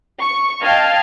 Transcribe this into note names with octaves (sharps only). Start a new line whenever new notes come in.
C#6
D#5 F5 G5 A5 F6 G#6